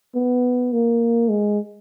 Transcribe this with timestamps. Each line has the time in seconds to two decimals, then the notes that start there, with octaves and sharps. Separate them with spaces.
0.15 B3
0.73 A#3
1.29 G#3